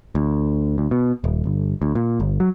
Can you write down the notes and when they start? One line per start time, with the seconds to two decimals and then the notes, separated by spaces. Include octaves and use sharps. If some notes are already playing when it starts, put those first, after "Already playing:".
0.15 D2
0.78 D2
0.91 B2
1.24 D#1
1.46 G1
1.82 D2
1.95 A#2
2.20 G1
2.40 F#3